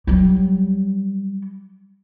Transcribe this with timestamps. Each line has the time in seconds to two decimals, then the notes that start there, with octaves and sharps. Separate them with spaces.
0.07 F#3 G3